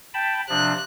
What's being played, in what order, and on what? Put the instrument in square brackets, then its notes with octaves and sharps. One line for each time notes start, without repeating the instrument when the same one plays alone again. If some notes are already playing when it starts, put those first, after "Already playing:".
[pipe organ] G5 A5 B5
[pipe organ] C3 F3 D4 [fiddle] F#6